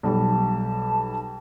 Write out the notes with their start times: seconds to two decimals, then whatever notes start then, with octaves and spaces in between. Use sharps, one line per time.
0.03 B1 G3 A5